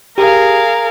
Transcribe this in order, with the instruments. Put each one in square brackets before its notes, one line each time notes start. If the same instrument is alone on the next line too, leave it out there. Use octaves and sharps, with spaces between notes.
[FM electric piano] G4 [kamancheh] G#4 F5 [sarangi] A#4